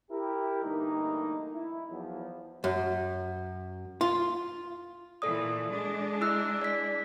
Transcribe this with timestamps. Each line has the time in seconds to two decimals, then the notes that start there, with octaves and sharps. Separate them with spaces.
0.11 E4 G4 A#4
0.63 G2 D3 E3 A3 A#3 D#4
1.54 E4
1.91 E2 F3 F#3
2.64 F#2
4.01 F4
5.22 A#2 E3 A4 D5 D#6
5.70 G#3 D4
6.21 E4 E6 F#6
6.62 D5 B6